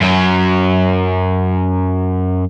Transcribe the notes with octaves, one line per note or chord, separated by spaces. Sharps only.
F#2 F#3